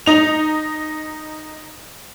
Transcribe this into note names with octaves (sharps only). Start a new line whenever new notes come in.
D#4 F7